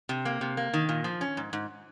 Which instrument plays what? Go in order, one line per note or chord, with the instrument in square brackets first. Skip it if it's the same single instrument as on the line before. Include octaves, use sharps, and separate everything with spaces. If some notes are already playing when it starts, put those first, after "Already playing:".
[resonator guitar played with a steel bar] C3
A#3
C3
A#3
D#3
A#2
F3
C#4
G#2
G#2